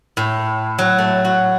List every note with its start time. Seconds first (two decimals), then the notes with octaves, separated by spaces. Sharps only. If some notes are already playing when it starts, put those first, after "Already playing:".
0.17 A2
0.78 F#3
0.98 A3
1.25 F#4